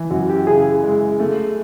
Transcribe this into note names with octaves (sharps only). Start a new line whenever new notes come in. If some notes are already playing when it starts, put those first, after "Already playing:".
Already playing: E3
F#2 F#4
G4
C#3 G#4
G#3
A3